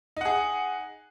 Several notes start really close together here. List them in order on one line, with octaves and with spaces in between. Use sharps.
D#4 F#5 G#4